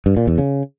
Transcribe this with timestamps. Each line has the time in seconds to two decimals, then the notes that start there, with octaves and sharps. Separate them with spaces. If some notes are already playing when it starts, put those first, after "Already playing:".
0.06 G2
0.17 A#2
0.27 E2
0.38 C#3